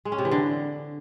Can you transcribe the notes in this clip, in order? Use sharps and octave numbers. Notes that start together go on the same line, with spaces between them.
G#3
C#4
C3
E3
D3